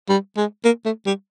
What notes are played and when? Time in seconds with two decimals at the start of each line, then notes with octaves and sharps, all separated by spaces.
0.09 G3
0.37 G#3
0.65 A#3
0.85 A3
1.06 G3